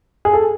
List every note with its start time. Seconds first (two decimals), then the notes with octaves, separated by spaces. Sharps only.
0.25 G#4
0.33 A4